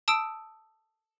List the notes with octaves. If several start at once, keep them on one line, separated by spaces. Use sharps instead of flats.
A5 D#6 E6 D7